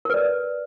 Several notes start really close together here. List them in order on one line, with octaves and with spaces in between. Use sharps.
A#4 B4 D5